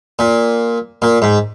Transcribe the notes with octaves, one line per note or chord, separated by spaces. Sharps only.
A#2
A#2
G#2